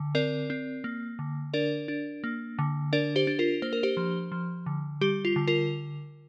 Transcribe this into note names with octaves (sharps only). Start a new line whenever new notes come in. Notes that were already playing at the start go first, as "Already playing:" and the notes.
Already playing: D3
C4 A#4 D5
C4
A#3
D3
D4 A#4 D5
D4
A#3
D3
D4 A#4 D5
G4 C5
D4
F4 A#4
A#3 C5
A#4
G4 C5
F3
F3
D3
G3 G4
F4
D3
F4 A#4